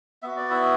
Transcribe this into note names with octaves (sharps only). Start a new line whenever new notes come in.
B3 F#4 E5
D5
E4 E5